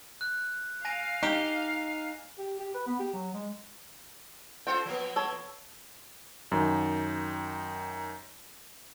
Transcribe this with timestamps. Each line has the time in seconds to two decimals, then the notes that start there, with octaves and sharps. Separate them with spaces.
0.21 F#6
0.85 F5 G#5 A#6 D#7
1.23 D#4 G4
2.38 G4
2.59 G4
2.74 B4
2.87 B3
2.99 G4
3.13 F#3
3.34 G#3
4.67 F4 A4 C5 G5
4.85 F3 A#3 B3
5.16 A4 C#5
6.52 F#2 D#3